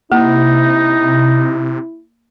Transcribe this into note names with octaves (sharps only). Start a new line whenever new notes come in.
C3 A#3 D#4 E4